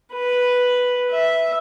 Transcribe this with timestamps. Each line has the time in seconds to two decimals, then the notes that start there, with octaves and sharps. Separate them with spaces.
0.13 B4
1.11 E5